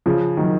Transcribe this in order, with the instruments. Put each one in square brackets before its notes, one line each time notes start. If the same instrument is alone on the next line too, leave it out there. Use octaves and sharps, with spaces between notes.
[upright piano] C#3 F3
D#3 F#3